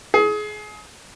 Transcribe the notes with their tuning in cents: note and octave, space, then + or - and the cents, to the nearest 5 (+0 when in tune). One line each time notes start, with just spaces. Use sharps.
G#4 +25